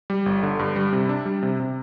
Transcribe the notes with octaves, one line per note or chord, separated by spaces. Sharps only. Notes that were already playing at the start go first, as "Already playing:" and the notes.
G3
G1
D3
G2
G3
C3
D4
G3
C3
C3